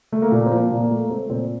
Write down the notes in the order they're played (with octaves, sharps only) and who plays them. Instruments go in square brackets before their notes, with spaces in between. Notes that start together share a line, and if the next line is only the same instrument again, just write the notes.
[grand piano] A3
A#3
A#2
C4
F3 A#3
A#2
A#3
A3
A3 C4
A#2 C4